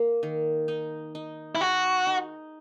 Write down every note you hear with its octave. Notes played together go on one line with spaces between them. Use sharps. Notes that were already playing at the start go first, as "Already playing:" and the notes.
Already playing: A#3
D#3
D#4
D#4
E4
F#4 G#4
D#4